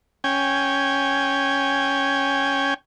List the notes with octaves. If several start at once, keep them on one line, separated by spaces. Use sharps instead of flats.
C#4 G5 G#5